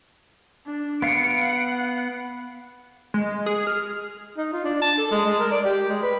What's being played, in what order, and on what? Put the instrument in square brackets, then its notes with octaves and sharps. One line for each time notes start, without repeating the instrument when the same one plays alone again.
[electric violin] D4
[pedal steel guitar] B3 F5 [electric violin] C#7 D7
[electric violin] F#5
[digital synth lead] G#3
G#4
F6
[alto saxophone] D#4
F4
D4
A5
A4
G#3
G#3
A#4
D5
G4
G#3
B4